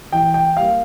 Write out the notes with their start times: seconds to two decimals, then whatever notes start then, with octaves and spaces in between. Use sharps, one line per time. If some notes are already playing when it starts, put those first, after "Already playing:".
0.12 E3 G5
0.34 G5
0.56 G3 A#3 F5